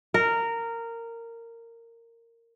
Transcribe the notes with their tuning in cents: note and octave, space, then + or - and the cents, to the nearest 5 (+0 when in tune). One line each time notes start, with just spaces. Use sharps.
A#4 -15